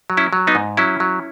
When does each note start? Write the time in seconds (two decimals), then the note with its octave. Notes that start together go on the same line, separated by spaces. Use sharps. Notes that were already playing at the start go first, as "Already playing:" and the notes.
0.10 F#3
0.17 C#4 E4
0.33 F#3
0.47 B3 D#4
0.55 G#2
0.77 F#3 C#4 E4
1.00 F#3